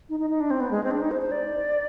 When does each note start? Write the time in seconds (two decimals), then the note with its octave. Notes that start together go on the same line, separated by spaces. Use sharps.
0.09 D#4
0.20 D#4
0.30 D#4
0.40 D4
0.51 C4
0.60 B3
0.71 G#3
0.84 C4
0.91 D4
1.01 D#4
1.11 C5
1.21 C5
1.32 D5